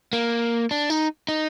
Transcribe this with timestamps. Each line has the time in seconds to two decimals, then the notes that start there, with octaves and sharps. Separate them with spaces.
0.13 A#3
0.71 D4
0.90 D#4
1.28 D#4